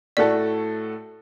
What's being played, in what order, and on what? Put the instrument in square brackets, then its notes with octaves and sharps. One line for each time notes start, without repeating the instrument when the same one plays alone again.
[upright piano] A2 A3 F#4 A4 [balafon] D5